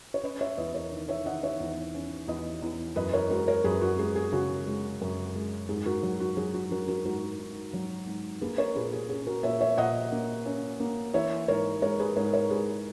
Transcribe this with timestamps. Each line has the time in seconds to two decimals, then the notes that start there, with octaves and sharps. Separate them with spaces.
0.14 C#5
0.24 C#4 B4 D#5
0.41 C#5 E5
0.57 E2 B4 D#5
0.74 A#4 C#5
0.92 D#3
1.08 C#5 E5
1.26 D#3 D#5 F#5
1.43 C#5 E5
1.60 E2
1.95 C#4
2.28 E2 B4 D#5
2.62 E2
2.96 F#2 B4 D#5
3.13 A#4 C#5
3.30 G#3 F#4 A#4
3.48 A#4 C#5
3.64 F#2 G#4 B4
3.82 F#4
3.99 G#3 G#4
4.16 G#4
4.32 C#3 F#4
4.67 G#3
5.01 F#2
5.35 G#3
5.69 G#2 G#4
5.86 F#4 A#4
6.03 F#3
6.20 F#4
6.37 F#3 G#4
6.54 F#4
6.71 F#3 F#4 A#4
6.88 F#4 A#4
7.05 G#2 F#4 A#4
7.39 G#2
7.73 F#3
8.07 G#2
8.41 A#3 G#4 B4
8.58 A#4 C#5
8.76 A#2 G#4 B4
8.93 G#4
9.09 C#4 G#4
9.27 F#4 A#4
9.43 A#2 C#5 E5
9.61 C#5 E5
9.78 A#2 D#5 F#5
10.12 A#3
10.46 C#4
10.80 A#3
11.14 E3 C#5 E5
11.48 G#2 A#4 C#5
11.82 G#3 A#4 C#5
11.99 G#4 B4
12.16 G#2 A#4 C#5
12.33 A#4 C#5
12.50 G#3 G#4 B4